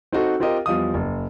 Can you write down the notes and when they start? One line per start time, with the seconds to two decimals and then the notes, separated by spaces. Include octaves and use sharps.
0.12 C4 D#4 F#4 A4
0.40 C4 F4 G4 A#4 D#5
0.66 E2 F3 G3 D#5 F5 D#6
0.94 F#1